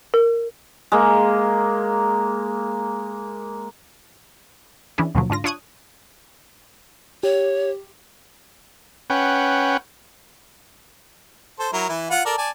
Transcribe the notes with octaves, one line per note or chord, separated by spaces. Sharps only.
A#4
G#3 A#3
E3 C#4 D4 E4 G#4
D#2 B2 D3 F3 F#3
G#2 D3 F4 A#6
D4 F4 C#5 D#6 F#6 G#6
G4 C#5
C#4 B4 F#5 G5
A4 C5
F#3 E4 A#4
E3 E4
F4 F#5
A4 A#4 D5
D5 G#5 A5